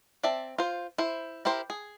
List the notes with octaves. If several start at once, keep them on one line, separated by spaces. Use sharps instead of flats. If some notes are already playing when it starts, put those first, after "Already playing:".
C4 D5 E5 A5
F4 C5
E4 C5
E4 G4 A#4 C5
G#4